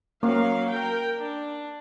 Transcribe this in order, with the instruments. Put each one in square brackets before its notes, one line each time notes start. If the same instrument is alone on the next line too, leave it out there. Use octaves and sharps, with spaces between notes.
[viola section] F#3 F5 [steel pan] A#3 C#4
[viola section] A#4 G5
D4